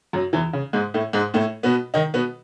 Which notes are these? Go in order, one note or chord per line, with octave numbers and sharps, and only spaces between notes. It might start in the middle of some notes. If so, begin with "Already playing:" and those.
F#2 F#3
E2 E3
C#3
G#2 G#3
A2 A3
G#2 G#3
A2 A3
B2 B3
D#3 D#4
B2 B3